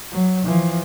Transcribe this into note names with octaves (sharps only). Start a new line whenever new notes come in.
F#3
E3 F3